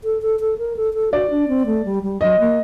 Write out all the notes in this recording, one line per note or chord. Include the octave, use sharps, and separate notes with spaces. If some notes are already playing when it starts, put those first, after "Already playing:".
A4
A4
A4
A#4
A4
A4
F#4 D5
D4
C4
A3
G3
G3
F#3 D#5
A#3